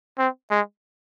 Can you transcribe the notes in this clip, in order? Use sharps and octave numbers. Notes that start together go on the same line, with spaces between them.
C4
G#3